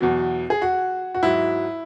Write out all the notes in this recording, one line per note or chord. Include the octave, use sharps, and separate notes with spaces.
E2 B2 F#3
G#4
F#4
F#4
G#2 F#3 E4